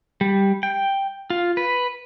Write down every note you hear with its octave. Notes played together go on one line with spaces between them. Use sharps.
G3
G5
F4
B4